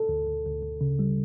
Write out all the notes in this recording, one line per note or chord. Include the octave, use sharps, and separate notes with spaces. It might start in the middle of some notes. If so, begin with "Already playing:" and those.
Already playing: A4
D2
D2
D2
D2
C#3
G3